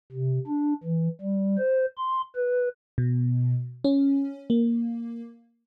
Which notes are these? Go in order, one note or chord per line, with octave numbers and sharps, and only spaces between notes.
C3
D4
E3
G3
C5
C6
B4
B2
C#4
A#3